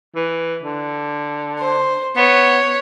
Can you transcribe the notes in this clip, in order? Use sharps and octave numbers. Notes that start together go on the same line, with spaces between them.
E3
D3
C5
B3 C#5